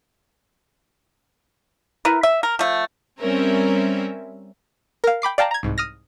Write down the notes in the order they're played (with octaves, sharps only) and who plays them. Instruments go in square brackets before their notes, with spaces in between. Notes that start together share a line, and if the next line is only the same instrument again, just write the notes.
[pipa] E4 A#4 B4
E5
A#4
F3 A3
[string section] G3 C4 C#4 A#4 E5
[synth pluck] A#4 F5
G5 B5 D6 C7
D5 F5 G5 A5 A#5
A#5 G#6
C2 G#2
D#6 F6 A#6